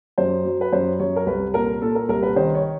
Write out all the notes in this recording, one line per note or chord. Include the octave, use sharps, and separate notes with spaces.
F#2 C5
F#3
B4
F#2 C5
F#2 C#5
A#4
C2 B4
A#2 A#4
A#2 A4
A#4
C2 A#4
B4
D#3 C5
C#5